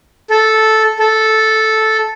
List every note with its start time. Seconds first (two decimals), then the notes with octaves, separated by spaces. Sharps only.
0.30 A4
0.99 A4